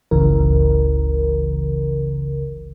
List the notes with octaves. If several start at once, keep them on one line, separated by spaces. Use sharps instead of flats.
G1 C#2 C#3 E3 A#4